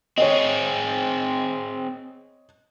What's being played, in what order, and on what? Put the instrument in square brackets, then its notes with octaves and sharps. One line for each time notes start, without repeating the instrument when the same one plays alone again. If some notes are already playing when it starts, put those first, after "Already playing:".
[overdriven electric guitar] C4 G#4 [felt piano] C#5 D#5